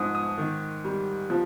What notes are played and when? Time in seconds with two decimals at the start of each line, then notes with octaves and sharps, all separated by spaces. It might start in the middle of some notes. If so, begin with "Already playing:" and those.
Already playing: G#2 F3 D#6
0.15 D#6
0.38 D#3
0.84 G3
1.30 F3